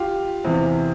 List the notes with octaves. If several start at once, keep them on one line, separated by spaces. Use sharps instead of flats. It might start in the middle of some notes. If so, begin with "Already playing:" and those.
Already playing: F4 G4
E2 C3 E3